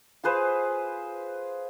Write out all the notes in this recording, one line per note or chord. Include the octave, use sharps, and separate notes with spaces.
F4 G#4 B4 C5